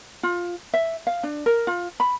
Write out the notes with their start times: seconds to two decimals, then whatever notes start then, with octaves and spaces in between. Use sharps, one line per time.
0.23 F4
0.74 E5
1.07 F5
1.23 D4
1.46 A#4
1.67 F4
2.00 B5